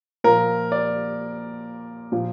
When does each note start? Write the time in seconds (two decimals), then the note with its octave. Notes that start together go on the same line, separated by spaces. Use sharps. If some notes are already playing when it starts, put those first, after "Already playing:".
0.24 A#2 F3 A#4
0.72 D5
2.12 A#2 F3